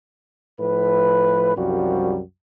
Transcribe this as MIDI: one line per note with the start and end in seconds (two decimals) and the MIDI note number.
0.60 1.55 45
0.60 1.55 53
0.60 1.55 71
1.57 2.20 36
1.57 2.20 42
1.57 2.20 53
1.57 2.20 55
1.57 2.20 66